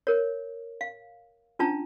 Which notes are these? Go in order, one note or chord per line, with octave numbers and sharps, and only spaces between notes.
A#4 C#5
F5
C#4 D4 F4 A5 A#5